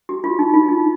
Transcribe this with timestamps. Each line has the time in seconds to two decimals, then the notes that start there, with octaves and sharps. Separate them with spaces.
0.09 F#4
0.24 F4
0.39 D#4
0.53 F4
0.68 D#4